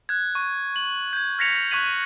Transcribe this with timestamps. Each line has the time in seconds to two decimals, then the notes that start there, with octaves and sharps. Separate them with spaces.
0.09 F#6 G#6
0.35 C#6
0.76 F#7
1.13 G6 G#6
1.39 F6 G#6 A#6 B6 C#7 F7
1.71 C#6 F#6 G#6 B6 D#7 F#7